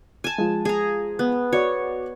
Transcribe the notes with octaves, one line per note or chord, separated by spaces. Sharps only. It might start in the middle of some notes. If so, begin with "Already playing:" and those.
G#5 A5
F3 G#3
G#4 A#5
B3
F#4 C#5 D5